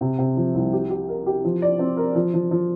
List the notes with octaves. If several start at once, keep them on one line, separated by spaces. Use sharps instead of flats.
C3
C3
F3
C2
G4
G4
A#4
G4
F3
D5
C4
A#4
F3
F3
F3